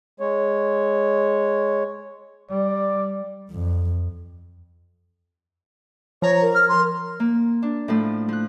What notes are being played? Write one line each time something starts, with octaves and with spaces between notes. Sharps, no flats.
G#3 C#5
G3 D5
F2
F3 C#5 A#5
A#4
F6
C6
A#3
D4
A2 F3 A3
F3 F#6